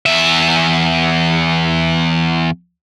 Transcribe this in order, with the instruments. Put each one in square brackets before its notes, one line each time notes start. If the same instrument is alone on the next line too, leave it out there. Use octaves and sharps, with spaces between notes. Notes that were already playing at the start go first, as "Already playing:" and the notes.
[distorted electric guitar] E2 E5